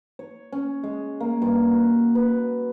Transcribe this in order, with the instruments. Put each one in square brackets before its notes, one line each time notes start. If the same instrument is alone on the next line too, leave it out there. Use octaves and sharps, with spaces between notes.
[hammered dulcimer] C#5
C#4
G#3
A#3
G2
F#4
B4